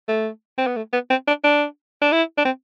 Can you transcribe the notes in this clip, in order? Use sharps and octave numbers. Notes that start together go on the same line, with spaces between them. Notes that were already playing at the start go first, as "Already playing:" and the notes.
A3
C4
B3
A3
B3
C4
D4
D4
D4
E4
D4
C4